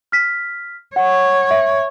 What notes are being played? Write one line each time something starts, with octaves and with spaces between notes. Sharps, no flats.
F6 B6
C#5 F#5
E5